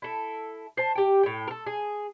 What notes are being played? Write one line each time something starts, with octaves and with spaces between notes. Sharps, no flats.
E4 A4
C5 A5
G4 G5
A2 G5
A4 A#4
G#4